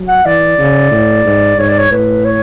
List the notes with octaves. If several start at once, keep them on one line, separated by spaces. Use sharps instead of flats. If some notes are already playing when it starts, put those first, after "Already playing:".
Already playing: F#3
F#5
E3 D5
C#3
A2
G#2
G#2 C#5
D5
C#5
A2 B4
C#5